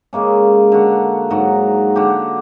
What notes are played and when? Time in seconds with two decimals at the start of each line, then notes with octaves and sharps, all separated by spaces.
0.13 C#3 G#3 A#3 C#4
0.72 D3 F#4
1.30 G#2 F#3 F#4
1.96 D3 F#4 G4